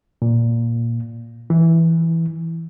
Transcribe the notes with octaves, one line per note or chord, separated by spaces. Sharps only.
A#2
E3